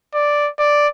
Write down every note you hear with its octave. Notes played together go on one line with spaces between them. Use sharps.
D5
D5